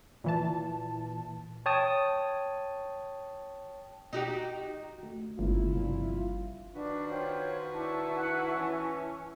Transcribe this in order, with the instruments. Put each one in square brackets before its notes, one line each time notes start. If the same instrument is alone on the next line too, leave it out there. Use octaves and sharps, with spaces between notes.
[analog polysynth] A#2 E3 A5
[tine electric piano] C#5 G5 A5 D#6
[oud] D#4 F#4 G4
[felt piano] A3 F#4
[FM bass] G1 [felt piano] G#2 C#3 A#3 [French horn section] E4 F4
[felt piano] A#1 G2 C3
[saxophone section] D#3 F#4 B4 [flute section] D4
[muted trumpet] F4 [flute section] C5 C#5 G5
[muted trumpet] D4 [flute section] E4 A5 C#6
[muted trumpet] F#5
[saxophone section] E3 [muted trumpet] C#4